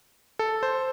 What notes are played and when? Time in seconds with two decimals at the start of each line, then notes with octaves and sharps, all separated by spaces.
0.39 A4
0.63 C5